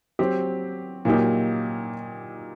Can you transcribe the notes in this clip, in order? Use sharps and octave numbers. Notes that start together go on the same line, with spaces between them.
F#3 C4 G4 C5
A#2 F#3 A#3 D#4 G4